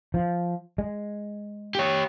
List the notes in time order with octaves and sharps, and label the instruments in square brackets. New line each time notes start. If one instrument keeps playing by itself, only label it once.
[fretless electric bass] F3
G#3
[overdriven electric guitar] G4 C#5